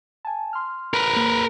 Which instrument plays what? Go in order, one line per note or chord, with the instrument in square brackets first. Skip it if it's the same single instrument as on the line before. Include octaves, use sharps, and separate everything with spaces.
[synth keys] G#5 A5
C6 F6
[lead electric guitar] A#4 B4
[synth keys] A#3